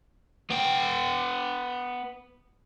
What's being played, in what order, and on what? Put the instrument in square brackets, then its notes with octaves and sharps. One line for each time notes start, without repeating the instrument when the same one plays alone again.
[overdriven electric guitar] B3 G5